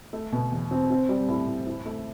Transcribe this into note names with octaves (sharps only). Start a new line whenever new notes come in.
A3
B2
E2
C4
C4
G3
A2
A2
E4
A3